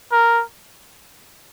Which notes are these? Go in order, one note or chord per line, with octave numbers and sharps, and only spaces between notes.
A#4